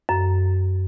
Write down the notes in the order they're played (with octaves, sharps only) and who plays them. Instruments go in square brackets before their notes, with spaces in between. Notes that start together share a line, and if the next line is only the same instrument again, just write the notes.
[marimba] F#2